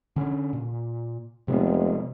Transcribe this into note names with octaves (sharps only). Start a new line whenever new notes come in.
D3 C#4
A#2
F1 C3 G#3 B3